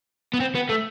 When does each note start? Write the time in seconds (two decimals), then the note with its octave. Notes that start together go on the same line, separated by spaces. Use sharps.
0.34 B3
0.40 C4
0.55 B3
0.69 A3